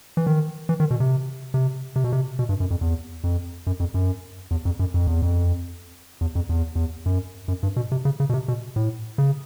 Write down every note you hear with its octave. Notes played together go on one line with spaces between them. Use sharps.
E3
D#3
E3
D#3
B2
C3
C3
C3
B2
C3
B2
G2
F#2
F2
E2
F2
F#2
F2
F#2
E2
F2
F#2
F2
E2
F2
E2
F2
E2
E2
F#2
F#2
G2
B2
C3
C#3
C#3
B2
C3
B2
A2
C#3